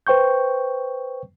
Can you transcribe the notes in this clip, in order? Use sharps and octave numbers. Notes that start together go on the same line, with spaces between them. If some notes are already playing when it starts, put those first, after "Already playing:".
B4 C5 G5 C#6 G6